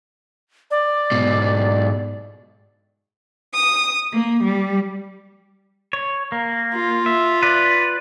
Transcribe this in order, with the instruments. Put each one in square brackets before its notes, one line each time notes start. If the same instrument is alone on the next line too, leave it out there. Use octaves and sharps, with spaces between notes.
[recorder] D5
[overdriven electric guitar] G#2 B2
[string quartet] D#6
A#3
G3
[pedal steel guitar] C#5
A#3
[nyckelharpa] F4
[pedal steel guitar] E5
B4 D5